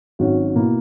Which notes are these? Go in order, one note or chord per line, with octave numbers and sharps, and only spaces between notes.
G#1 G#2 F#3 C#4 F#4
B2 A#3 E4